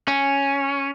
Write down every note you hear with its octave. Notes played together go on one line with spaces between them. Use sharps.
C#4